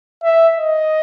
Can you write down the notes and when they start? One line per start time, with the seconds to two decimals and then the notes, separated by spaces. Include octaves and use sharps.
0.24 E5
0.58 D#5